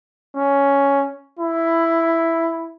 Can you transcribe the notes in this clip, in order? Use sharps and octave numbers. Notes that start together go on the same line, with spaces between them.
C#4
E4